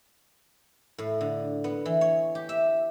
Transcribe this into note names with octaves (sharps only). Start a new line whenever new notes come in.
A2
D3
B3
E3
C#5
G4
E5